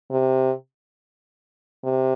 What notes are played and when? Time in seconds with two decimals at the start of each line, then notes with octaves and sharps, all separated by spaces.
0.11 C3
1.84 C3